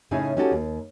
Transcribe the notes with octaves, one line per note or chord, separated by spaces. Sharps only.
A2 C#3 C#4 D#4 E4 G#4
C#4 D#4 F#4 G4 A4
D#2